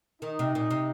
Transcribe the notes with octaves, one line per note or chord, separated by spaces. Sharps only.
D#3 D#4
C3
A#2
C3